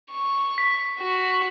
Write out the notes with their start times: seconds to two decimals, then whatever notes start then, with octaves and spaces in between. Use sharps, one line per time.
0.11 C#6
0.58 B6
1.00 F#4